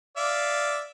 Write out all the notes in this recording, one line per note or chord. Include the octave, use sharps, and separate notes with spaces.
D5 E5 F5